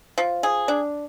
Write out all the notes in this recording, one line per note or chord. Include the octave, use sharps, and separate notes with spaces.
F3
G#4
D4